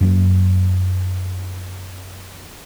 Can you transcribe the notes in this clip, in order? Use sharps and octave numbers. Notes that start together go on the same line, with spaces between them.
F#2 F#3 A#3